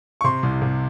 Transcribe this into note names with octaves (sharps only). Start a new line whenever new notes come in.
C#6
C3 C6
C2
C3